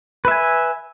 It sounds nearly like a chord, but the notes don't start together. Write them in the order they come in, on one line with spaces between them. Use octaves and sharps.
B4 E5 G#5